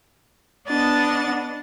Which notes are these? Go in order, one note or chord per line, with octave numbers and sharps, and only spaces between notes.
B3 D4 D#5 A6